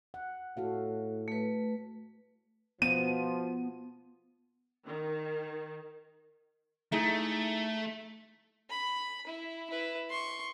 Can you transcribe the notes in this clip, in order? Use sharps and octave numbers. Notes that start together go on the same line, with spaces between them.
F#5
A2 F#4 A4 F5
A3 B4
B2 F3 B3 D#7
D#3
A3 D#4 E4 G#4
B5
E4
E4 B4
C6 C#6